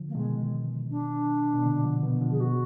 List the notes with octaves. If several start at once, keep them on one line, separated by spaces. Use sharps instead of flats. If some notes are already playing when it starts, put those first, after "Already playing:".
Already playing: D3 F3
A#3
B2 D#3 G#3
D4
B2
A#2 D3
D3 F3
B2 D#3
D3 F3
G#4
B2 F#4